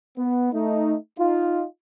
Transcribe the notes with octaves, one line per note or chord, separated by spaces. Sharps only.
B3
A3 D#4
D#4 F4